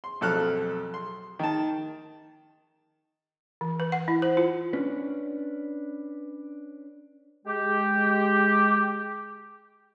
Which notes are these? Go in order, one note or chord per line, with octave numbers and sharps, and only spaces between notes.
C6
B1 F2 A4 F6 F#6
C6
D#3 A5
E3
B4
F#5
E4
C5
F4
C#4 D4 B4
G#3 G4